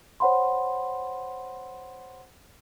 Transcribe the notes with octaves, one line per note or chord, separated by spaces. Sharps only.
C5 C#5 F#5 B5 C6